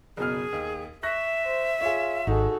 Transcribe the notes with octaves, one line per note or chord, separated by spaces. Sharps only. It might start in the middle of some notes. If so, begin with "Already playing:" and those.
F#1 B2 G#4 F6
D#2
E5 C#6 F#6 A#6
C5
F4 G#4 C#5
G#1 D#4 F#4 G#4 A4